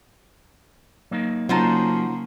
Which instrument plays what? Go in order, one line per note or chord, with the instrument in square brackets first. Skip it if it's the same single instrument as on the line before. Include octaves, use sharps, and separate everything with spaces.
[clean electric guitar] F#3 A#3 D#4
[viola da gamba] C#3 A#3 [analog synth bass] F#3 [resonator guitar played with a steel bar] D#4 F4 C5 [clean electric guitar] F#5 A5